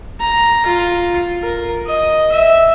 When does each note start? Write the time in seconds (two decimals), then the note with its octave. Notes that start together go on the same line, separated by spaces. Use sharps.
0.20 A#5
0.66 F4
1.42 A#4
1.87 D#5
2.32 E5